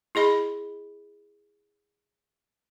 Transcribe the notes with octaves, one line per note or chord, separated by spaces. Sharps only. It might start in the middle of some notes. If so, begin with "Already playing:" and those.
E4 G#4 D#5 B5